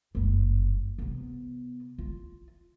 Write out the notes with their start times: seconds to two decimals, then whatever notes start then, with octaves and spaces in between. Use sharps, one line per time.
0.15 F#1 G2
0.98 C3 B3
1.98 F4